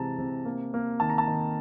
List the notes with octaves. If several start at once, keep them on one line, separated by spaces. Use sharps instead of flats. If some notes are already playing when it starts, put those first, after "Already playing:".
Already playing: C3 E3 G#3 A5 A#5
C3
A#3
A#3
D#3 A5
A#5
A5
D#3